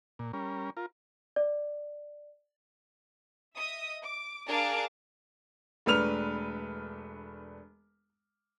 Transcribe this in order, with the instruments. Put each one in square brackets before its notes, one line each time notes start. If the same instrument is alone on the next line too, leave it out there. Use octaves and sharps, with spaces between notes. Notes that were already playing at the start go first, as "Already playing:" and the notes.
[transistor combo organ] A#2
G3 C#4 A#4
F4 A#4
[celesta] D5
[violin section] D#5 E5 D#6
D6
D4 G#4 A#4 F5 A5 D6
[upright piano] E1 A3 D4 B4 F6 F7